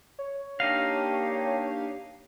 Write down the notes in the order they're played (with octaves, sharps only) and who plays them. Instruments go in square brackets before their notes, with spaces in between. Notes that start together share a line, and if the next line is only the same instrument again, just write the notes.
[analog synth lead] C#5
[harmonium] A#3 D4 G4 [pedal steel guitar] D#4 F5